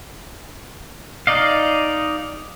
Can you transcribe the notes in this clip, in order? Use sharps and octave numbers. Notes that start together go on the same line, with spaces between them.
D#4 D5 D#5 F5